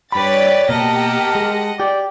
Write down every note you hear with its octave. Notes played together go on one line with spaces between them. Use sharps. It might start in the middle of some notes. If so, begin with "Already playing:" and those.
G2 G4 B4 C#5 D5 B5 A6
B2 A#3 G4 A#4 D#5 F#5 A5
G#3
G4 D5